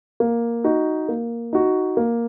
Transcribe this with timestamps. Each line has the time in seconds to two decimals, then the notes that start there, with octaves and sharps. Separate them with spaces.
0.20 A#3
0.64 D#4 F#4
1.08 A#3
1.53 D#4 F#4
1.97 A#3